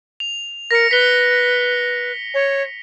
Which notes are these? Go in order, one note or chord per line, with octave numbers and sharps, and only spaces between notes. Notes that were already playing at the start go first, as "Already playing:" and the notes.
F7
A#4 A#6 C#7
B4 B6 G7
C#5